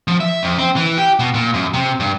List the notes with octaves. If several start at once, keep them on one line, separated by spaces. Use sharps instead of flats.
F3
E5
F2
C4
E3
G4
B2
A#2
F#2
C3
G2